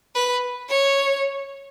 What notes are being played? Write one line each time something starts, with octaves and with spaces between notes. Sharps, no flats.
B4
C#5